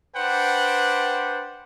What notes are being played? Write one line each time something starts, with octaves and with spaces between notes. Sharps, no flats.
D4 B4 C5 F#5 G5